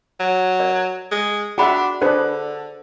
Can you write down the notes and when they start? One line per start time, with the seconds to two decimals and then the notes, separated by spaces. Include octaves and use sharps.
0.20 F#3
0.59 A#4 D5
1.11 G#3
1.58 D4 F#4 G#4 E5 G5 B5 C6
2.02 D3 D4 G#4 B4 C5